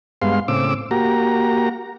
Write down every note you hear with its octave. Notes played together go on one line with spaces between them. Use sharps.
G2 G#3 B3 F5 C6
A2 C#3 C4 D6 E6
A#3 F#4 G4 A#5